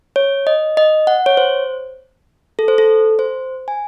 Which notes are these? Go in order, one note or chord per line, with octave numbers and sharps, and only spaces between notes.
C#5
D#5
D#5
F#5
C#5
C5
A4
C5
A4
C5
G#5